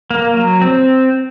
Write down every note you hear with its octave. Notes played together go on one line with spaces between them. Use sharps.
A#3
F#3
C4